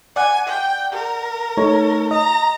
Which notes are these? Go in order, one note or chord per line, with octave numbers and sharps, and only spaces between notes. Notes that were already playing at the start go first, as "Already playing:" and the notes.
D5 F#5 G#5
G5
A#4
A3 D#4 C#5
D#5 A#5